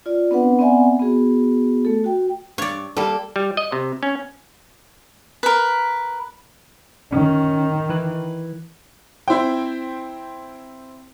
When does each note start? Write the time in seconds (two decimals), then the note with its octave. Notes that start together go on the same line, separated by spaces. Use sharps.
0.06 F4 D5
0.31 B3 C4 D4 B4 F#5
0.59 B3 C4 D5 E5 F#5 G#5
0.99 B3 F#4 G#4
1.85 A3 A4
2.04 F#4 G5
2.58 G2 C#5 D5
2.97 G3 A#3 A4
3.36 G3
3.57 D#5
3.72 C3
4.03 C#4
5.43 A#4 B4
7.12 D#3 C#4
7.89 E3 B4
9.28 C4 E4 C5 G5